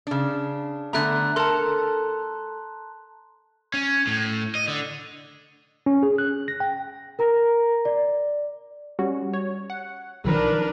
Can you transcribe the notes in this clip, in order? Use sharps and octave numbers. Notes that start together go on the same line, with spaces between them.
C#3 D4
D3 A3 B3 A#5 F#6
A4 A#4 A5 C6
C#4
A2
D#5
D3
C#4
G#4
F#6
A#6
G5
A#4 A#5 A#6
D5
G3 C#4 F#4
C#5
F#5
B1 D#3 F3 D4 A#4 B4